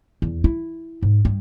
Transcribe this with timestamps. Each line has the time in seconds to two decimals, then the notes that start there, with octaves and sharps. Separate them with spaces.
0.22 E2
0.44 E4
1.02 G#2
1.25 G2